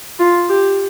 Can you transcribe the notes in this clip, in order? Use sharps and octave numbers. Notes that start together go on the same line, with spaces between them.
F4
G4